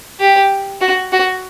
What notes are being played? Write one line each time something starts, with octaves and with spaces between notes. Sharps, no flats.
G4
F#4
F#4